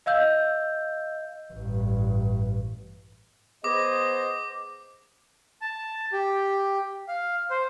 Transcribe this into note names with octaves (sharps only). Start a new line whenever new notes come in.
D#5 F5 E6 G6
A1 G2
B3 G#4 C5 D#5 D6
A5
G4
F5
C5